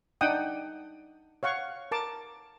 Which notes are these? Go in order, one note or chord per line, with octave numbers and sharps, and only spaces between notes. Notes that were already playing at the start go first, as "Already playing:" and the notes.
D4 D#4 F#5 G5 D#6
C#5 F5 F#5 C#6
A#4 A5 D6